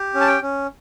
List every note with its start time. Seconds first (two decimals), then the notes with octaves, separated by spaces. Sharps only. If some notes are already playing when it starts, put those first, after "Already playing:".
Already playing: G4
0.14 C#4
0.21 A5
0.27 G5
0.42 C#4